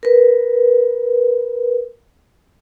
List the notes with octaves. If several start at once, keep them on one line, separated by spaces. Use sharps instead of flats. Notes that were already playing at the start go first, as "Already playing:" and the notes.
A#4 B4